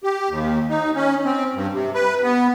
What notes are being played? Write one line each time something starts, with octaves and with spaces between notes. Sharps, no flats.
G4
D#2
D#4
C#4
C4
G2
C3
B4
B3